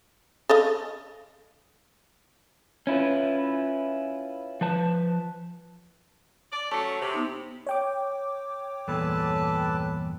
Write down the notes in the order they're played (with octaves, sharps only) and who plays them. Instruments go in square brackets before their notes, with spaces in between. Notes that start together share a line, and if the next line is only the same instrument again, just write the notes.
[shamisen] A4 D#5 F5
[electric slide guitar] C#4 E4 F4 B4
F3 B4 A5
[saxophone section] D5
[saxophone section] F#3 A3 C#4 [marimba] A5
[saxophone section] C3
[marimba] B3 D#4
[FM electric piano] C#5 G5 D6
[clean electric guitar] E2 G2 A#2 [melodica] A4 B4 A5